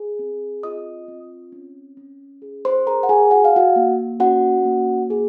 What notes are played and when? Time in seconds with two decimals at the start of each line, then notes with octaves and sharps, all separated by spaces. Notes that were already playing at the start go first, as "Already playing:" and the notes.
Already playing: G#4
0.19 C4
0.63 F4 D#5 D#6
1.08 C4
1.52 C#4
1.97 C#4
2.42 G#4
2.65 C5 C6
2.86 G#4 A#4 A#5
3.03 F#5
3.09 G#4 G#5
3.31 F#4 F#5
3.45 F5
3.56 F#4 F#5
3.76 A#3
4.20 C#4 F#4 F#5
4.65 A#3
5.10 G#4